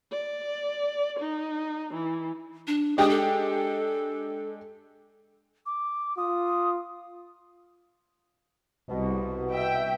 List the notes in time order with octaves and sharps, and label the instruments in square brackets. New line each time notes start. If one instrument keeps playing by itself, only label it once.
[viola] D5
D#4
E3
[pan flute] D4
[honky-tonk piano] G#3 D4 G4 [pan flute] D#6
[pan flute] A4
[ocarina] D6
[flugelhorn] F4 [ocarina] D#6
[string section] C2 [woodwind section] B2
[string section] E5 G5